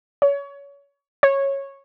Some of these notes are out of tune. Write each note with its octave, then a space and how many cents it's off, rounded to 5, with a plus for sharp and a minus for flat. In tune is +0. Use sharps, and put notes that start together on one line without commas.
C#5 +25
C#5 -10